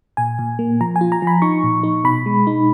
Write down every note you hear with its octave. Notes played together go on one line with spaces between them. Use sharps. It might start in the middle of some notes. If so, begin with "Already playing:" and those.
A#2 G#5
A#2
A#3
F3 A#5
G#5
F4
A#5
F3 B5
D#4 C#6
A#2
D#4
B2 B5
G#3
D#4